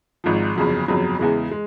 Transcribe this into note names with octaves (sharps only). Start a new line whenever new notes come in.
G#1 G#2 F3
G1 F2 C#3 F#3
G1 F2 C#3 F#3
E2 C#3 E3 G#3
G#3